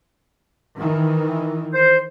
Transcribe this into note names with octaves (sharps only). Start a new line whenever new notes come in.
D#3 E3
C5